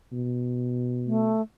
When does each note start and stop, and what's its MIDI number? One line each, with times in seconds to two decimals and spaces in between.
0.12 1.34 47
1.06 1.42 57